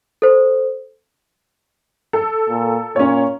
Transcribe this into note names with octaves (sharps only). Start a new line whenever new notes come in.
A4 C5
A4
A#2
A#2 C#4 C#5